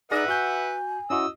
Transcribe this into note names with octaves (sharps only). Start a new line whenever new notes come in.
D#4 G#4 B4 D5 E5 F#5 A#6
F#4 G#5 G6
C#4 E4 F#4 D#5 E6